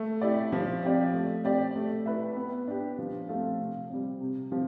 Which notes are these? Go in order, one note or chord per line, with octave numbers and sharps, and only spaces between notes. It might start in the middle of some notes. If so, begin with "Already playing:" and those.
Already playing: A3
E4 G4 D5
F3
C4 G4 D5
A3
C4 G4 D5
A3
E4 B4 E5
B3
D4 G4
F3
A3 C4 F4 A4
C3
G3 C4
C3
F3 C4 G4